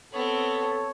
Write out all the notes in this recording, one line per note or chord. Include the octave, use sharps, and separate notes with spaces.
B3 C4 A4 C#5